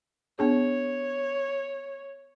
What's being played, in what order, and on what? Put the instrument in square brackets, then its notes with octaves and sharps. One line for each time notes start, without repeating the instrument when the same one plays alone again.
[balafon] B3 D4 G#4 [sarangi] C#5